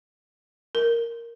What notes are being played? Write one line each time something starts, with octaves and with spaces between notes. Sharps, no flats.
A#4